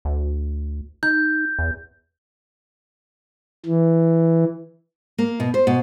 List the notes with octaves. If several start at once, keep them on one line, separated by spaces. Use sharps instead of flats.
D2
D#4 G6
E2
E3
A#3
B2
C5
B2